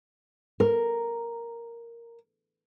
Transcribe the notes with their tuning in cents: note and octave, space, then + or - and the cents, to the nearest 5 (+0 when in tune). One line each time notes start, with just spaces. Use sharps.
A#4 +0